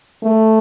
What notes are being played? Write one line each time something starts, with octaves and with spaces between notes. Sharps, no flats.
A3